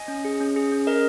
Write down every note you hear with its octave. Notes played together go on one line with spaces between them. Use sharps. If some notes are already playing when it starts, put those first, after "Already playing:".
Already playing: D#5 G#5
C#4
G#4
C#4
G#4
C#4
G#4 A#4 D#5